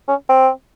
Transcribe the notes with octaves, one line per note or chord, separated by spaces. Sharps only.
C#4
C4